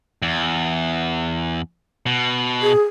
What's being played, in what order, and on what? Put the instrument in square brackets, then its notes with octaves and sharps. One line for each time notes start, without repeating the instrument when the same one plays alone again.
[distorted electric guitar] E2
B2
[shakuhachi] G#4